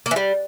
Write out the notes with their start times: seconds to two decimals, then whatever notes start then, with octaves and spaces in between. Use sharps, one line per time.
0.06 A#3
0.11 E3
0.16 G3